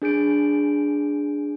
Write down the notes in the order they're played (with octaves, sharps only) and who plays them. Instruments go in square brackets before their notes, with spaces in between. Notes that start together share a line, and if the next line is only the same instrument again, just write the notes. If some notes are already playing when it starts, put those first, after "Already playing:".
[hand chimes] D4 G#4 G6 D7